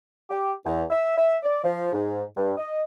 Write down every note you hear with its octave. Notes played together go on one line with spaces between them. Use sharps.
G4
E2
E5
E5
D5
F3
G#2
G2
D#5